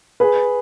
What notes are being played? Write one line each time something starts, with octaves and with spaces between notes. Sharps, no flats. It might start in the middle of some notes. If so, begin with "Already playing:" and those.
G#4 B4